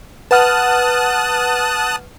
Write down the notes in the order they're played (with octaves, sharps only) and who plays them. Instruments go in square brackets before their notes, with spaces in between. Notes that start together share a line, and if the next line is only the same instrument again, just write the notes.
[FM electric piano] B4 F#5 F6 [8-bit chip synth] A5 D#6 F#6